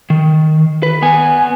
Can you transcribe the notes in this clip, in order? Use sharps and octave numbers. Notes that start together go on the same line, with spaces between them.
D#3
B4
B3 G#5